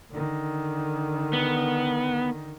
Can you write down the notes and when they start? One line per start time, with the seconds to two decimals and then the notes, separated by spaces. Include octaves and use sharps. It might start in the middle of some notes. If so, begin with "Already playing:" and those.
0.10 D3 D#3
1.33 B3